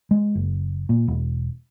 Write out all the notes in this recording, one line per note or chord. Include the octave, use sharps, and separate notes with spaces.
G#3
F#1
A#2
E1